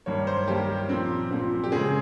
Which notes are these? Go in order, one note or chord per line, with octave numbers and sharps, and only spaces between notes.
G2 D#3 A#3 C#5
C5
G2 D#3 A#3 G4
A#2 F3 C4
A#2 F3 C4
G4
C#3 G#3 C4 G#4